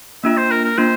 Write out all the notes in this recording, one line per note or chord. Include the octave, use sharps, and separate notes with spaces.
A#3 D4 F4 E5
C5
A#4
A#4
A#3 D4 F4 C5